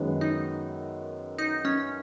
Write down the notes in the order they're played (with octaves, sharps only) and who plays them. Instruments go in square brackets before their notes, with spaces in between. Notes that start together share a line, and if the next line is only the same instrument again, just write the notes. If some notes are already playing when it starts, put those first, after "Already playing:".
Already playing: [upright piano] F#2 D#3 G#3 B3
[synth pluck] D#4
D#4
C#4